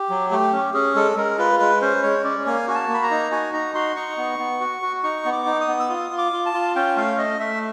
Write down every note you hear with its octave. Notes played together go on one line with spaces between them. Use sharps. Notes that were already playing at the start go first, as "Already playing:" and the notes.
Already playing: G4
F#3
A3 G4
C#4
C#4 G#4
G#3 A4
G#3 A#4
F4 B4
G#3 B4
C#4 C5
G#3 C#5
C#4 D5
A#3 G#5
F#4 G#5
A5
A#3
B5
A#5
D#4
F#4 G#5
D#4 A#5
F#4 C6
D#4 C#6
B3
B3
F#4
F#4
D#4 C#6
B3
D6
D#4
D#6
B3
E6
F4 D#6
F4
D6
F4
A5
F4
C#4 G5
A3 F5
A3 D#5
A3 E5